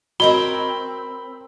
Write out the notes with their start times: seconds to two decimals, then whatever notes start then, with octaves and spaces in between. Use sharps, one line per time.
0.20 C4 F#4 A#4 C#5 D#5 B5 G7